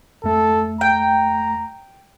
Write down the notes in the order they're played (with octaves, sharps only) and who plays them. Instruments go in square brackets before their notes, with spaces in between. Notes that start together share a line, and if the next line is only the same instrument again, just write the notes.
[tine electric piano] F2 A3 [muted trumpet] A4
[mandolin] G5 [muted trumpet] A#5